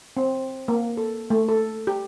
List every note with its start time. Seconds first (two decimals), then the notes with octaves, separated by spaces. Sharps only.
0.17 C4
0.68 A#3
0.97 A4
1.30 A3
1.49 A4
1.87 G4